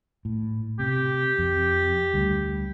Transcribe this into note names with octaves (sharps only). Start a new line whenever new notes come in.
A2
C3 G4
F2
D2 G3